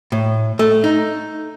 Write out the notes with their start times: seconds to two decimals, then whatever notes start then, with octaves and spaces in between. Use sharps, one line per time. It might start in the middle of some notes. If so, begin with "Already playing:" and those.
0.12 A2
0.59 A3
0.84 D#4